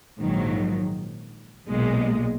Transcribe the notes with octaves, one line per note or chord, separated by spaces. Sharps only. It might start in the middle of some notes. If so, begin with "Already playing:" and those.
A#1 G#2 D#3 F#3
B1 A#2 G#3